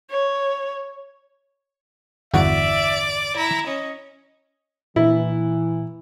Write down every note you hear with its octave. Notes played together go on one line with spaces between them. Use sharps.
C#5
G1 E2 F#4 D5 E5
E4 A#5
C#4 D#5
A#2 E3 E4